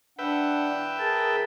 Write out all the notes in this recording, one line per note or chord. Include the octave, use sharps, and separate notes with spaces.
D4 B4 E5 F#5 G5
G#4 A#4 A5